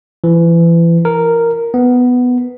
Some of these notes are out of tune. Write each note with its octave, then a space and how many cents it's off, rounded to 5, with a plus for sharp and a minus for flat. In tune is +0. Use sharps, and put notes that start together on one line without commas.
E3 +30
A#4 -5
B3 +5